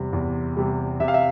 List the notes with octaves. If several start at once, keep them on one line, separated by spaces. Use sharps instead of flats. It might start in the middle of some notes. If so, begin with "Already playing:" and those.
Already playing: E2 C3 G3
E2
C3 G3
C3 E5
F5
E5